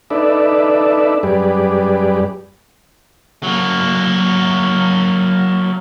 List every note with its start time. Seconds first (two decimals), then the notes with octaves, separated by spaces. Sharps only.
0.10 D4 D#4 A4 B4 D5 E5
1.23 F#2 G3 G4 G#4 B4 D5
3.43 F#3 A#3